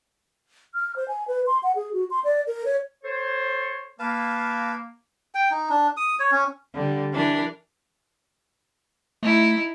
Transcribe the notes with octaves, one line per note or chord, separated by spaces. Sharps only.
F6
C5
G#5
B4
C6
F#5
G#4
F#4
C6
D5
A#4
C#5
A4 C5 C#5
A#3 B4 F5 A5
G5
D#4
D4
D#6
C#5
C#4
D3 G3
E3 D4 A#4
A3 D#4 E4